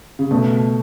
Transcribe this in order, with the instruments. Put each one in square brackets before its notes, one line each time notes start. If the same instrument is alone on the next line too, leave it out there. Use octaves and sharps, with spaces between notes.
[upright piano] C#3
[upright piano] B2 [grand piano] A3